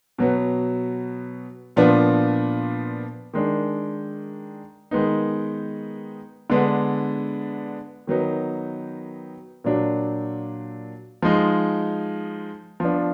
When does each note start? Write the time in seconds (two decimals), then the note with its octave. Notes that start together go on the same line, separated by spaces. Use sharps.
0.18 B2 F#3 B3
1.76 A#2 F3 B3 D4
3.34 D#3 G#3 D4
4.91 D#3 G#3 B3 D#4
6.50 D3 G#3 B3 D4
8.07 D#3 F#3 B3 D#4
9.64 A#2 F#3 D4
11.22 F3 G#3 D#4
12.80 F3 B3 D4